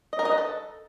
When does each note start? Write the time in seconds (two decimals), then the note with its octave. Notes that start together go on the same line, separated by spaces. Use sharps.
0.13 D#5
0.19 A#4
0.25 D#5
0.31 B4
0.38 A4